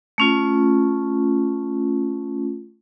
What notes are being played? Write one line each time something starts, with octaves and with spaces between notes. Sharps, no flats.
A3 C#4 F4